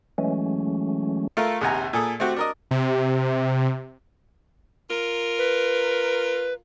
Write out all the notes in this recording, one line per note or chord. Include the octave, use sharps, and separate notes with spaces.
E3 F#3 G#3 A3 C#4
A3 F4 A4 A#4
A#1 D#2 C3 F#5 G#5 A#5
A#2 G#4 A4 D#6
A3 C4 F#4 G4
D4 A#4 D#5
C3
F4 A#4
B4